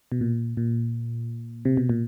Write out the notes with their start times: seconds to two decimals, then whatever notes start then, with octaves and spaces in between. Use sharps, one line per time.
0.12 B2
0.21 A#2
0.57 A#2
1.65 C3
1.77 B2
1.89 A#2